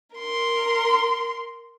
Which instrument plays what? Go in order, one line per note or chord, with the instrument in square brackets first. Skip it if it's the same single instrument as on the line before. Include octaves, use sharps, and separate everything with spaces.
[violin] A#4 C6